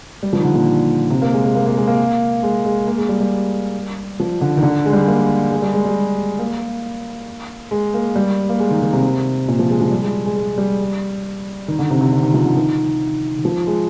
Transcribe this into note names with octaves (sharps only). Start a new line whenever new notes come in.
G3
F3
D#3
D3
A#2
C3
A#3
G#3
G#3
A#3
A#3
G#3
A#3
G#3
G#3
A#3
G#3
G3
G3
F3
D3
D#3
D3
G#3
G3
G#3
A#3
G#3
G3
G#3
G3
A#3
G#3
A#3
G3
A#3
G#3
D#3
D#3
C3
A#2
F3
G#3
F3
G3
G#3
G#3
G#3
G3
D#3
D3
C3
C3
D3
D#3
F3
D3
D#3
D#3
F3
G#3